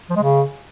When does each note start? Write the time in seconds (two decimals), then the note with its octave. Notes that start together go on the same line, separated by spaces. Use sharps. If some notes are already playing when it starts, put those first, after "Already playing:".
0.10 F3
0.16 G#3
0.23 C#3